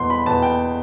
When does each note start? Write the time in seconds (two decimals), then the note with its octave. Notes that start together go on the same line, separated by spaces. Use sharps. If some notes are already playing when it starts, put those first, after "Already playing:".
Already playing: E2 B2 B3 C6
0.10 B5
0.26 E2 B2 B3 A5
0.42 G5